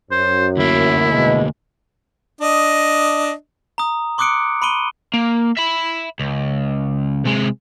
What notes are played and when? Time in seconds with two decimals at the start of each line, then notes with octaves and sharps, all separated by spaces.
0.11 F#2 C5
0.57 D2 A#3 E4
1.11 B2 G#3
2.41 D4 D#5
3.78 A#5 D#6
4.18 C6 D6 D#6 F#6 C#7 D7
4.62 B5 C6 D7 D#7 G7
5.14 A#3
5.57 E5 B5
6.19 C#2
7.25 C3 G#3